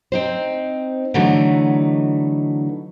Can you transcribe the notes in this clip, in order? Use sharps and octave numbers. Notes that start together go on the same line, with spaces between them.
C4 D#4 C5
D3 E3 F#3 A3 D#4